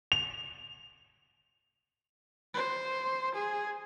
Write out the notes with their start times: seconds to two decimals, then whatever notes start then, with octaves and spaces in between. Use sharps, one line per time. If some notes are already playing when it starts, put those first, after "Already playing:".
0.12 F7
2.54 C5
3.35 G#4